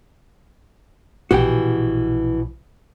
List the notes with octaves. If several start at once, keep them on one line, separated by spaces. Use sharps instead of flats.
A#1 B2 E3 F#4 G4 G5